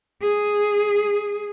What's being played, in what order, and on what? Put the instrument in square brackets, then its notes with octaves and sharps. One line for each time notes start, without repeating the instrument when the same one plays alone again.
[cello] G#4